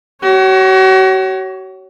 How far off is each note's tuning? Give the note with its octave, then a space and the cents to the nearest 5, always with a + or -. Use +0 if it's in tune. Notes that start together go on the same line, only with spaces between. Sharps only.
F#4 +40 C#5 +0